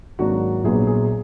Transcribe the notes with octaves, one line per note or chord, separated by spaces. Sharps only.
G#1 G#2 F#3 A#3 D4 F#4
A#1 A#2 F#3 B3 G#4
G#4